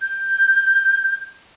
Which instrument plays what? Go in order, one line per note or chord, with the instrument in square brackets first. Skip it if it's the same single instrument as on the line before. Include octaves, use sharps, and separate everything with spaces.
[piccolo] G6